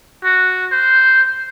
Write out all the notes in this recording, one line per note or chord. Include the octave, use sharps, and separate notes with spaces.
F#4
C5